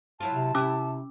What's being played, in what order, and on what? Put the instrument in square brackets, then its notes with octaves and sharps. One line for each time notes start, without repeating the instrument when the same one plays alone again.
[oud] F#3 E4 F4 [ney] A5
[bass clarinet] C3
[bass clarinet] C3 [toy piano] C#4 D6 E6 [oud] E4 G4